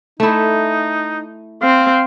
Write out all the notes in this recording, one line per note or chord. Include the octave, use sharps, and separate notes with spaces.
A3 D#4 E4
C4 F5